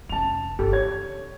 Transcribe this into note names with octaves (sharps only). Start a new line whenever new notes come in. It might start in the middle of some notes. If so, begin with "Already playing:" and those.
F1 C#4 A5 F7
G1 G4 A4
C#3 C#5 G#6